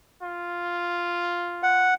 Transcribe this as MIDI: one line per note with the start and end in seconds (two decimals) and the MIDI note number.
0.22 1.96 65
1.63 1.94 78